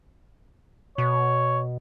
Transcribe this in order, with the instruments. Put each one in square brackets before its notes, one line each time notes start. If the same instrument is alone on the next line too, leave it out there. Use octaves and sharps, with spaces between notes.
[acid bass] B2 [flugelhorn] C#5